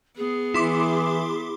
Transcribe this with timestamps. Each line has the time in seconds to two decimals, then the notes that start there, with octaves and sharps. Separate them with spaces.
0.17 B3 G#4
0.54 E3 E4 C6 D6